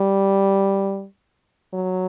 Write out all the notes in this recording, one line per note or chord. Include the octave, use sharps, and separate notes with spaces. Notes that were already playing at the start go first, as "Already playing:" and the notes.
Already playing: G3
F#3